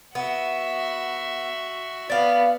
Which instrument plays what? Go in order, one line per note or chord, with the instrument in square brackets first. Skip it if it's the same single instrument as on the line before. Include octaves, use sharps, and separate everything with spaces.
[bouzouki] B3 [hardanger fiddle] F#4 E5
[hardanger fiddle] B3 [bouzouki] D5 F5